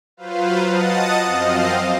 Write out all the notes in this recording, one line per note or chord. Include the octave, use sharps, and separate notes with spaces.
F#3 F4 B4 C5 F5
D#5 F#5 A5 D#6 A6
F#2 F3 C4 D#5 F5